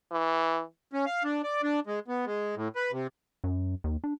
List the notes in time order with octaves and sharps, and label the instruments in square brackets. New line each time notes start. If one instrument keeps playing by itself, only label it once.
[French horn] E3
[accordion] C#4
F5
D4
D5
D4
G#3
B3
G#3
A2
B4
C3
[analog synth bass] F#2
D#2
D4